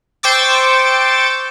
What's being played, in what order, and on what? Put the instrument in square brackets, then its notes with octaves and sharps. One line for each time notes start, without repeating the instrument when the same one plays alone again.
[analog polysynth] C5 G5 C#6 D6 E6 A6